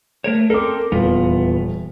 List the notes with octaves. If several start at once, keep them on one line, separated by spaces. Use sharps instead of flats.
A3 A#4 C#5
C4 A4 A#4 D6
D#1 E2 B3 F4